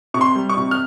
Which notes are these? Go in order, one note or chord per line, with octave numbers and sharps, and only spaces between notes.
C3 C#6
C6
G3
C#6
C3
F6